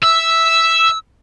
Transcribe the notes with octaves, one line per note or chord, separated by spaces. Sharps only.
E5 E6